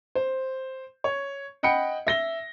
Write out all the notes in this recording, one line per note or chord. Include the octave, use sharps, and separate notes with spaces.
C5
C#5
D#5 F#5 G5 B5 C#7
E5 A#6 G7